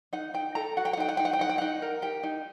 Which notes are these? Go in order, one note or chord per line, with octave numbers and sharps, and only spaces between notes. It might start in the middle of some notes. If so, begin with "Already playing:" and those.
D#4 F#5
D#4 G5
A4 A#5
F#4 F#5
G5
F#5
D#4 G5
F#5
D#4 G5
F#5
G5
D#4 F#5
G5
D#4 F#5
A#4
G4 G5
D#4